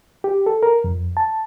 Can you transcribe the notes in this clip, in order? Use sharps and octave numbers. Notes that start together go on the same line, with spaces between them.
G4
A4
A#4
F2
A5